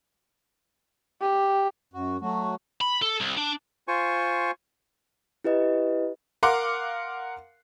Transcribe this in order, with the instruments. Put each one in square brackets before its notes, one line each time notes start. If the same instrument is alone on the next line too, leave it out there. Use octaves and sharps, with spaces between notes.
[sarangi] G4
[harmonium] F#2 F#4
F#3 A3 F#4
[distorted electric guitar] B5
A4
C2
D4
[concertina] F4 C5 G#5 C#6
[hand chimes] E4 G4 B4 D#5
[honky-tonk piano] A#4 F5 F#5 C6 D6